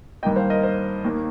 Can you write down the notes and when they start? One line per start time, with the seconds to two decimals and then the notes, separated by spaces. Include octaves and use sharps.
0.23 G2 D#3 A#3 D#5 G5
0.36 C5 F5
0.50 A#4 D#5
0.63 C5
1.04 D#2 D#3 A#3